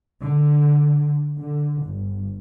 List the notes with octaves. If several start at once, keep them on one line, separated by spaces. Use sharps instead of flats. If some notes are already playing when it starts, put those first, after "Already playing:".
D3
D3
G1